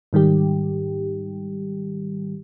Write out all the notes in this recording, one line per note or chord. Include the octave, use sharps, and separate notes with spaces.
G#2 D#3 G3 G4